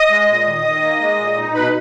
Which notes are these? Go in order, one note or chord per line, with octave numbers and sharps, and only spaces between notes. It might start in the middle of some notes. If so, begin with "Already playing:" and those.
Already playing: D#5 D#6
G#3
A#2
D#3
D#3
A#3
G#3
A#2
D#4
B2 B4 B5